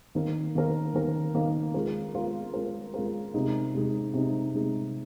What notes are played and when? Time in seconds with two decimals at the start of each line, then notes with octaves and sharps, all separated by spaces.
0.15 D#3 A#3 D#4 A#4
0.55 D#3 A#3 D#4 A#4
0.94 D#3 A#3 D#4 A#4
1.34 D#3 A#3 D#4 A#4
1.74 G#3 F4 A#4
2.14 G#3 F4 A#4
2.54 G#3 F4 A#4
2.94 G#3 F4 A#4
3.34 C3 G#3 D#4
3.74 C3 G#3 D#4
4.13 C3 G#3 D#4
4.54 C3 G#3 D#4